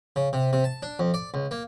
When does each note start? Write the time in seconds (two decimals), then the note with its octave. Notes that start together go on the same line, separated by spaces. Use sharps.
0.16 C#3
0.33 C3
0.53 C3
0.64 A5
0.83 D4
0.99 F2
1.14 D5
1.34 C#2
1.51 A#3